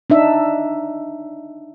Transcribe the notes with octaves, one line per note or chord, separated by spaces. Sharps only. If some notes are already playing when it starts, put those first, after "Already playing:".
D4 D#4 E5